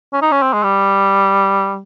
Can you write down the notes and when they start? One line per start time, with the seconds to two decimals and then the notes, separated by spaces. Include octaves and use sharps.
0.13 C#4
0.22 D#4
0.32 C#4
0.42 C4
0.53 G#3
0.63 G3